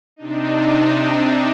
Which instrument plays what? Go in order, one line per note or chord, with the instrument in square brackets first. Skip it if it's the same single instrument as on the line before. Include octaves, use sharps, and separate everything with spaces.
[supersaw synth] C3 D4 D#4